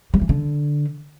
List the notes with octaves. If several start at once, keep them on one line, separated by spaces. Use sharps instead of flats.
G3
E3
D3